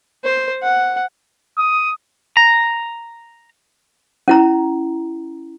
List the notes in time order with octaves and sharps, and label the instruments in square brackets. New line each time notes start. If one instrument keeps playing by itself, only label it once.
[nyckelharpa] C5
F#5
[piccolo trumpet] D#6
[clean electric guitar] A#5
[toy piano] C#4 E4 A#5